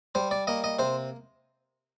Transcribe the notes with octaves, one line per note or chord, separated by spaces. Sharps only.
G3 C5
D5
A#3 D#5
D#5
C3 C5